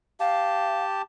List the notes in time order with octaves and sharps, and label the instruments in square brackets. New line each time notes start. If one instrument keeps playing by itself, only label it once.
[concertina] G4 A5 [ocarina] F5